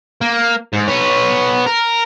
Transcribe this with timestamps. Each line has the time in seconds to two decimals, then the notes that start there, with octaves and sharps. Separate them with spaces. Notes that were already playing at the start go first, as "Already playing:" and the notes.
0.21 A#3
0.73 G#2
0.88 B3 C#5
1.67 A#4